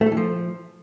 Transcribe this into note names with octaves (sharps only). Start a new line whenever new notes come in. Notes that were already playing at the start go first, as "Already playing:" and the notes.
A3
A4
E3
F3